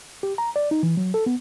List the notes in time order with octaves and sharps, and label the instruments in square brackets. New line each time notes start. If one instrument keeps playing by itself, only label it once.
[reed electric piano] G4
A#5
D5
D#4
E3
F#3
A4
B3